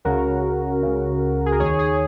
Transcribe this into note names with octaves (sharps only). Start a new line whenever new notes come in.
C#2 C#3 F#4 A#4
C#2 C#3
G#4
A#4
D#2 D#3 G#4 C#5
G#4